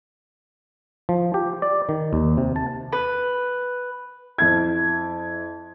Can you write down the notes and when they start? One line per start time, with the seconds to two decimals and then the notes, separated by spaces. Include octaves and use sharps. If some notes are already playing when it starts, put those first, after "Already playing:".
1.09 F3
1.34 G4
1.62 D5
1.89 D#3
2.13 D#2
2.37 C3
2.56 A5
2.92 B4
4.38 F2 E4 G#6